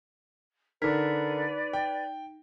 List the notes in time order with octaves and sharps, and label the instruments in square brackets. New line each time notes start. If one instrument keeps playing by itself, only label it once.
[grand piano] D3 A#4 [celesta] D#4 B6 [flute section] B4 D5
[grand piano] G5